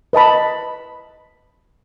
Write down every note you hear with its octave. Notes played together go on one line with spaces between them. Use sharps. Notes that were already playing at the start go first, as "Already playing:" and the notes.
B4 D#5 A5 B5